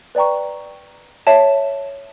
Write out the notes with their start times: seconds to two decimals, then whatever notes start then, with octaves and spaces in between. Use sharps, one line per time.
0.15 B4 D5 G5 A#5 C#6
1.27 C#5 E5 A5